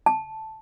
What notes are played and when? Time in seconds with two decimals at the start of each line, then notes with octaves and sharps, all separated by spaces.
0.06 A5